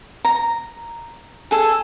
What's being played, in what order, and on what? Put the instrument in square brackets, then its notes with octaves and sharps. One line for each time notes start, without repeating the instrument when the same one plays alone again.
[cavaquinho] A#5
G#4 A4 G#5